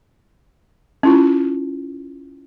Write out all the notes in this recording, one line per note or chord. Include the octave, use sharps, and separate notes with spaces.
C#4 E4 F4